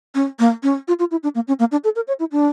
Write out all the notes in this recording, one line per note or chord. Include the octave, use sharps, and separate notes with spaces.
C#4
A#3
C#4
F4
F4
E4
D4
A#3
C#4
A#3
D4
A4
A#4
C#5
E4
D4